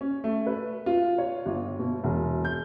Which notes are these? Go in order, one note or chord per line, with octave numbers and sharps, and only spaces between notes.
C#4
A3
B4
F4
C#5
G1
B2
E1
G6